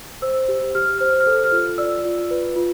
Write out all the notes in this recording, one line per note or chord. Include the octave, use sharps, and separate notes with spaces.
C5 E6
G4
G4 F6
C5 F6
F6
A4
F6
F4
D5 E6
F4
B4
F4